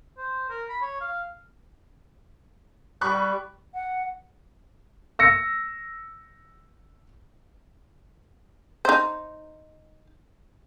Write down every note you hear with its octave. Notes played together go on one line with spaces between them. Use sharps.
C5
A#4
B5
C#5
F5
G3 B5 C#6 F#6
F#5
E6 A#6 C#7
D#4 C5